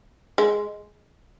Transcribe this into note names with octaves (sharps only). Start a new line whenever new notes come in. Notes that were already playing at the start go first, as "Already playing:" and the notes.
G#3